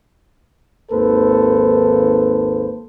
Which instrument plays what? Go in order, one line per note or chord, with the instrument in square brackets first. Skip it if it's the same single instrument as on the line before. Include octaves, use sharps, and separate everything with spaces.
[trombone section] G#1 D#2 A#3 A4 B4 C5